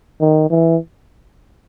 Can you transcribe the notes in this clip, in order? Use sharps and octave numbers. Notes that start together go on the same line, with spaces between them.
D#3
E3